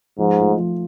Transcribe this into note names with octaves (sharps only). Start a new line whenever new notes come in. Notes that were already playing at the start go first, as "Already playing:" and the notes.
G#2 F3
A3 F4
F3